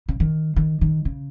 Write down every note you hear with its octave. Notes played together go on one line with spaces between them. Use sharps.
C#3
D#3
D#3
D#3
C#3